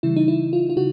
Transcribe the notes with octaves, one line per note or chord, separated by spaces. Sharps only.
C#3 E3 G3 E4
D#4
E4
F4
F4
C#3 F#4